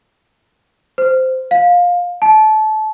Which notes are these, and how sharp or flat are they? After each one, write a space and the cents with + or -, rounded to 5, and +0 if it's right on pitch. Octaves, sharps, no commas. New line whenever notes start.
C5 -10
F5 +20
A5 -25